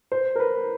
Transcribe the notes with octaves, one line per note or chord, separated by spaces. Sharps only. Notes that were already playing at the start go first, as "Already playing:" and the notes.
C5
A#4
B4